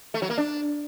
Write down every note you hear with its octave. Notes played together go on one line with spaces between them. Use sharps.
A3
F#3
A#3
D4